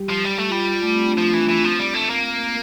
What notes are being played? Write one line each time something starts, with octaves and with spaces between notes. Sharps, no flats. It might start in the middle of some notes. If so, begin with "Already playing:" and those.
Already playing: G3 G4
F3
G3
A3
F4
G3
F4
A3
C4
D4
F3 F4
E3 D4
E3 C4
F3 C4
G3
A3
A#3 C4
C4